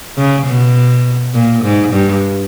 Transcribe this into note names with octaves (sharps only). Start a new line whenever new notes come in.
C#3
B2
A#2
G#2
G2